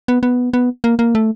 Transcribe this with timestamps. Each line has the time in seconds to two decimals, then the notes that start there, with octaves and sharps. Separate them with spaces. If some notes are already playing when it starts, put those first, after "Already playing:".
0.08 B3
0.23 B3
0.53 B3
0.84 A#3
0.99 A#3
1.15 A3